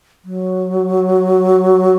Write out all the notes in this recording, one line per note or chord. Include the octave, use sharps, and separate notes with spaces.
F#3